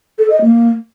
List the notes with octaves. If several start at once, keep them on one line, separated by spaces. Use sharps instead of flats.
A4
D#5
A#3